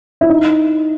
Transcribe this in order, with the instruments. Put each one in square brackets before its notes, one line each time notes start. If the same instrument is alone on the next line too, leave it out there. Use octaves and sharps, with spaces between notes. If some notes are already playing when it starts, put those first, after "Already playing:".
[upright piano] E4
D#4